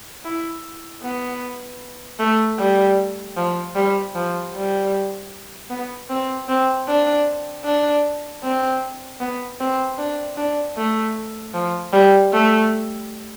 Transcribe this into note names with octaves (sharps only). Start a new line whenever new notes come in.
E4
B3
A3
G3
F3
G3
F3
G3
B3
C4
C4
D4
D4
C4
B3
C4
D4
D4
A3
F3
G3
A3